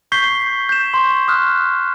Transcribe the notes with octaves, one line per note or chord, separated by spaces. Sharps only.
C#6 G6 B6 C7 G7
G6 E7
C6 C#6
C6 D#6 F6 F#6